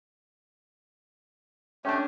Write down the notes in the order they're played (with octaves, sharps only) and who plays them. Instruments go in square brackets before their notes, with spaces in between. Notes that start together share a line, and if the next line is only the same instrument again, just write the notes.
[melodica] A3 G4 [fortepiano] C#4 D4